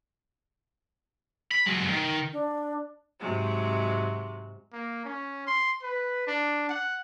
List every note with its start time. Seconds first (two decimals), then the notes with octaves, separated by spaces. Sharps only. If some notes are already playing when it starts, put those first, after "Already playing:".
1.52 B5
1.67 F#3 G#3
1.90 D#3
2.32 D4
3.19 G#2 C3 F#3 G#3
4.73 A#3
5.05 C#4
5.47 C6
5.83 B4
6.27 D4
6.69 F#5